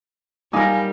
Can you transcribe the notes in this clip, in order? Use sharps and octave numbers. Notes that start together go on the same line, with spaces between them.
G3 D#4 A#4 F5 G#5 D6